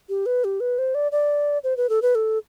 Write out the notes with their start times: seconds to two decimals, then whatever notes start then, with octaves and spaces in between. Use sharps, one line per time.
0.09 G4
0.26 B4
0.44 G4
0.60 B4
0.78 C5
0.95 D5
1.12 D5
1.64 C5
1.77 B4
1.89 A4
2.02 B4
2.15 A4